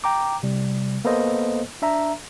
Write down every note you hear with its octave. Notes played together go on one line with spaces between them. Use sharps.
G5 A#5 D6
C3 G3
A#3 B3 A4 B4 C5 D#5
D4 E5 A#5